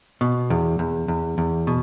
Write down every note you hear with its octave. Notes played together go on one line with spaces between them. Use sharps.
B2
E2
E2
E2
E2
B2